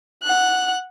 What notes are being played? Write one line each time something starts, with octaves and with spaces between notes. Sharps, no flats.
F#5 F#6